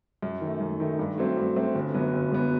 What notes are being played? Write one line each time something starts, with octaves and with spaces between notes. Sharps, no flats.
F#2
D#3 A3
F#2
D#3 A3
G2
F#3 A3 C4
G2
F#3 A3 C4
G1
F#2 F#3 B3
G1
F#2 F#3 B3